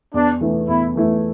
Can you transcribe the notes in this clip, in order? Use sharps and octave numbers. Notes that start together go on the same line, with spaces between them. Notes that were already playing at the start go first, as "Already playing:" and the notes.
E2 D4
E3 A3 E4
E2 E4
E3 A3 E4